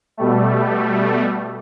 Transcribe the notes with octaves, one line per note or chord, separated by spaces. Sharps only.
B2 G3 A3